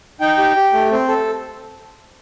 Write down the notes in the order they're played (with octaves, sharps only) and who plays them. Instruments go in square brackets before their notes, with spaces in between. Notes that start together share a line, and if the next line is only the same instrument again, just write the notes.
[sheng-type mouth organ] D#4 G5
G4
G4
A3
C4
A4